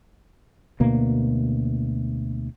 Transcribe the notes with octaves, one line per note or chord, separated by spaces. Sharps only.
D2 B2 A#3